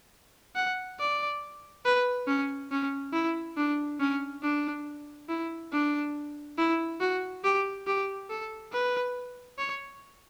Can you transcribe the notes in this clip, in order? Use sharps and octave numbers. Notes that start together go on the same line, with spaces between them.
F#5
D5
B4
C#4
C#4
E4
D4
C#4
D4
E4
D4
E4
F#4
G4
G4
A4
B4
C#5